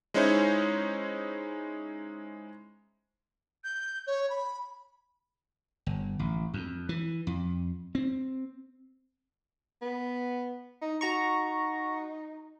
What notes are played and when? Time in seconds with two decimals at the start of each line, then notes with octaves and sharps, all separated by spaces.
0.14 G#3 C#4 D#4 E4 C5 C#5
3.64 G6
4.07 C#5
4.30 B5
5.86 G1
6.19 A1
6.54 F2
6.89 E3
7.27 F2
7.95 C4
9.82 B3
10.82 D#4
11.01 D#4 F#4 A#5 C#6